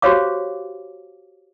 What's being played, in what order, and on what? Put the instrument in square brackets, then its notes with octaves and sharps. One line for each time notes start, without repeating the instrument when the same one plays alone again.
[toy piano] F#4 G4 C5 C#5 F5 D6